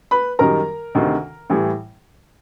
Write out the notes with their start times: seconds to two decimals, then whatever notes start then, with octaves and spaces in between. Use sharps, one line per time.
0.11 B4 B5
0.39 F#2 D#3 G3 A#4 A#5
0.95 D2 C3 D#3
1.50 A2 E3 G3